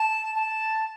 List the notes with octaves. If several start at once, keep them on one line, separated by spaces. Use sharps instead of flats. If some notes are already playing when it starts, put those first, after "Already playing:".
Already playing: A5
A5